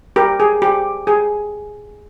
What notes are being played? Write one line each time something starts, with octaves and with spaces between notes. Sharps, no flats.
G4 A#4
G#4
G4
G#4